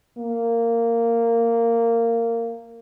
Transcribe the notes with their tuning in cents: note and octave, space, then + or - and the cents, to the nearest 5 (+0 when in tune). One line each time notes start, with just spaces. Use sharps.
A#3 -15